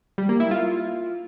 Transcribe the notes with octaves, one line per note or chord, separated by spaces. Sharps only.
G3
A#3
E4
F4